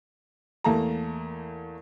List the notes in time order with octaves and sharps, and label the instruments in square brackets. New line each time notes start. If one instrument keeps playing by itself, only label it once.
[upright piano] E2 A3 A#3 A5 A#5